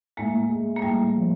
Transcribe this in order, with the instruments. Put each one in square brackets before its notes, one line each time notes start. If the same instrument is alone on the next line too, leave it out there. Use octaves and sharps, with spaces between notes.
[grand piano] A2 [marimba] G#3 A#3
[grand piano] G#3
[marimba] A#3
[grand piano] A2 [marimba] G3 A3
[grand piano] F3